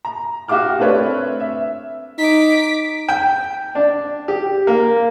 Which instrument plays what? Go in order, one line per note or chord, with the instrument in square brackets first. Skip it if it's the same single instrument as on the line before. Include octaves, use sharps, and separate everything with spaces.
[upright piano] A#5
F#4 G4 F5 D6 F6
A3 C4 D4 B4 C#5
E5
[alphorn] D#4 [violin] D6 B6
[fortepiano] G5
D4
G4
A#3